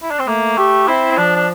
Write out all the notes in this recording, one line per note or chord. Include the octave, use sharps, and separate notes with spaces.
E4
D4
C4
A3 A#3
A3 G4
C4 E4
C4
F3 D4
D4